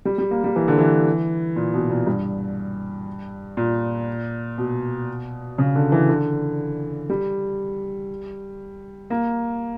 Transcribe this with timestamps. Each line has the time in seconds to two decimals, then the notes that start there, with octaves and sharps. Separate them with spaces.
0.05 G3
0.18 G3
0.31 A#3
0.44 G3
0.56 E3
0.68 D3
0.78 E3
1.56 A#2
1.74 B2
1.90 A#2
2.07 G2
3.57 A#2
4.58 B2
5.58 C#3
5.75 D3
5.92 E3
6.09 D3
7.10 G3
9.10 A#3